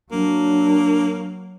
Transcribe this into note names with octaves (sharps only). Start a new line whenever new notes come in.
F#3 A#3 D4